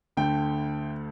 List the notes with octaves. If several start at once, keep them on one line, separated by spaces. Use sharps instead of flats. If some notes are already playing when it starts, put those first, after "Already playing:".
D2 D3 A3 G5